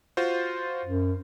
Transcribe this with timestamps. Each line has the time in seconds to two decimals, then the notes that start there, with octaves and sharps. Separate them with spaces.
0.17 F4 F#4 C5
0.85 F#2